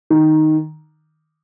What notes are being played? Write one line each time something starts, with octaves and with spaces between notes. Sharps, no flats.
D#3